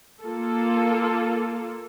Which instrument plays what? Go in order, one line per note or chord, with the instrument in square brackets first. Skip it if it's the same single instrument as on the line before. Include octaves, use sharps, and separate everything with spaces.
[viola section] A#3 F4 A4